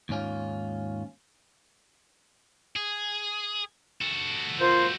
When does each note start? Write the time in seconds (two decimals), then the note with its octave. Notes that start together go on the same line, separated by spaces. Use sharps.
0.09 D#2 G#2 C#4 F4
2.76 G#4
4.01 F#4 A4
4.60 A#3 F4 C5